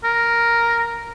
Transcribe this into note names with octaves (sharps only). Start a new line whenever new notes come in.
A#4